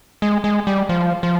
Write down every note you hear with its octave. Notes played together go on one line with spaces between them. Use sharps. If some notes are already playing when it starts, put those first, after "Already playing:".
G#3
G#3
G3
F3
F3